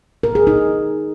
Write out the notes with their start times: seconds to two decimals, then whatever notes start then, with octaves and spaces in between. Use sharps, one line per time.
0.23 A#4
0.35 G#4
0.47 D#4